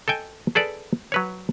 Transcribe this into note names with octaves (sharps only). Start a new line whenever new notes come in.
A4 D#5 G5 G#5
G#4 A4 B4 D5
F#3 B4 C#5